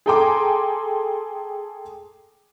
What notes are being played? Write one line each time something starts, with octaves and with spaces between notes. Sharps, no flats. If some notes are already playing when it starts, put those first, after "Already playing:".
G#4 A4 G5 A#5 C6 D6